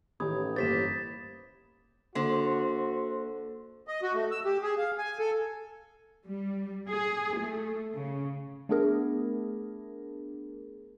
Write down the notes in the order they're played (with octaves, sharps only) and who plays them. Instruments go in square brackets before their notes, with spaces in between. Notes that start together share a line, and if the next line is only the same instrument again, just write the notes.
[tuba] A1 [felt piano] D#3 C#4 G4 [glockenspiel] B5 D#6 G#6
[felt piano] G1 A#3 C5 [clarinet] G4 [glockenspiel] A6 B6 E7
[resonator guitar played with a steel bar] D3 [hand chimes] A#3 [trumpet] F#4 [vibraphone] C5 C6
[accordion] D#5
F#4
A3
E6
G4
G#4
F5
G#5
A4
[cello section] G3
G#4
A3
C#3
[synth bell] A3 B3 D4 G#4 A#4